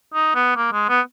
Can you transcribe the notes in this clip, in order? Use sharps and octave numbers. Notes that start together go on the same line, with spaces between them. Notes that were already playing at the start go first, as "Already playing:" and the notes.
D#4
B3
A#3
G#3
B3